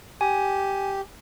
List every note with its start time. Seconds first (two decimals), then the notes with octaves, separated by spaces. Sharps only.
0.21 G4 G#5